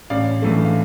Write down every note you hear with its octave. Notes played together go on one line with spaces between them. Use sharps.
A1 D5 F5
G2 E3 A3
F5